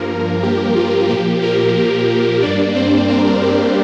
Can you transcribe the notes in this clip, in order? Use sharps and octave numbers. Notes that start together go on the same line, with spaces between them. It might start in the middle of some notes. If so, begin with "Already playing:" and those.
Already playing: G2 F3 A#3 A#4
G4
F4
A#2 F3 A#3 G4
A#3 A#4
G2 G3 A#3 D4 D5
C4 C5
A#3 A#4
G4